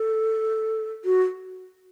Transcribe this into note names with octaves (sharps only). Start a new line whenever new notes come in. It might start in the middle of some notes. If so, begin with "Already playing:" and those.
Already playing: A4
F#4